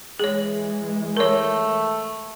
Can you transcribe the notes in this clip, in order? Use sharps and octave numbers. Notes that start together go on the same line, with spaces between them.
E3 G#3 G#4 C#5
A3 A#4 C#5